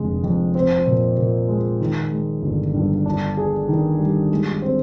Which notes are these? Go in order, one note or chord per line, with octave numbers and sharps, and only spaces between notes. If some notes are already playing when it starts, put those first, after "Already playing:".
Already playing: F1 D3 G#3
F2
C4
A#2
A#2
G#3
D#3
G#3
G1
G2
D4
G#4
D#3
G3
G#3
C4